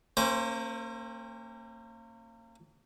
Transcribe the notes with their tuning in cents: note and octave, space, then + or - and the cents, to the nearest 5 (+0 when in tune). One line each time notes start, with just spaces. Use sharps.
A#3 -35 C#4 -45 C5 -10